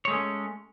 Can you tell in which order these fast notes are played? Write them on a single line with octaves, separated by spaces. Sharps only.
C#5 G#3 A3 C#4